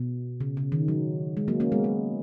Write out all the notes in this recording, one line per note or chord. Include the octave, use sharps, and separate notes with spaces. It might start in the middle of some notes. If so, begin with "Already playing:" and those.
Already playing: B2
C#3
C#3
D#3
F#3
G#3
F#3 A#3
A#3 C#4
G#3 B3
G#3